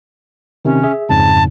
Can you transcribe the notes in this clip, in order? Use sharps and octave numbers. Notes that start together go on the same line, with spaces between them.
C3 D#3 C#4
G#4 E5
F2 G#2 C#3 A5